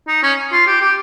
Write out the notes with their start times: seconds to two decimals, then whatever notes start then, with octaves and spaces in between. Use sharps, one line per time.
0.08 D#4
0.23 C#4
0.52 F4
0.67 G4
0.81 G4